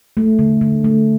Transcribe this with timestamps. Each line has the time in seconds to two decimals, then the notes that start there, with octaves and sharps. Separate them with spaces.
0.17 A3
0.39 D3
0.61 D3
0.84 A3